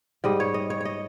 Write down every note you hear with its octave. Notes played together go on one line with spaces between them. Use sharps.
G#2 G3 D#5
C#5
D#5
C#5
C#5 D#5